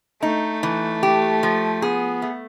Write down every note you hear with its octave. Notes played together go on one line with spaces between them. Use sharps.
A3 D#4
E3
G4
F3
B3 G#4
A3